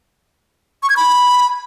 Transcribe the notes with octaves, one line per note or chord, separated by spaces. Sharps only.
C#6
G#6
B5